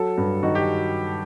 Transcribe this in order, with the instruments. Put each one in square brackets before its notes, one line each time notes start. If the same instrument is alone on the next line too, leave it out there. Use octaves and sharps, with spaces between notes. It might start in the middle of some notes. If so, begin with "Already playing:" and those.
Already playing: [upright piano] F#3 [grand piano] A4
[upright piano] G2
[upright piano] D#3 [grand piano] F#4
[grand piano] G4